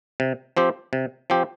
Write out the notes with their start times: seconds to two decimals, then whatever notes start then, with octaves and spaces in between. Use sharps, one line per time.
0.20 C3
0.57 F3 C4 G4
0.93 C3
1.30 F3 C4 G4